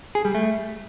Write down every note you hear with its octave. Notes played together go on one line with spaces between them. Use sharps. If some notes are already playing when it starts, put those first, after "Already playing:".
G#4
G3
A3